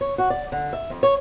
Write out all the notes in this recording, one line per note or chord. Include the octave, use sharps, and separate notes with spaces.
C#5
F#4
D5
D3
E5
F2
C#5